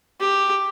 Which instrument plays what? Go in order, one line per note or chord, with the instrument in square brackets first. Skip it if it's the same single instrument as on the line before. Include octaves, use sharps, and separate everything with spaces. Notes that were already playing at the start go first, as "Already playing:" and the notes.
[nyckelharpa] G4